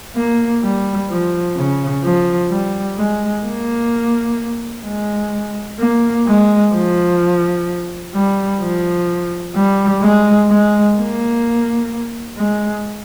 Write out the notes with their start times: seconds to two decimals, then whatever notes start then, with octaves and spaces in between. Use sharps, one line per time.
0.16 A#3
0.63 G3
1.10 F3
1.56 C#3
2.03 F3
2.51 G3
2.98 G#3
3.45 A#3
4.85 G#3
5.80 A#3
6.27 G#3
6.73 F3
8.14 G3
8.61 F3
9.55 G3
10.02 G#3
10.49 G#3
10.96 A#3
12.37 G#3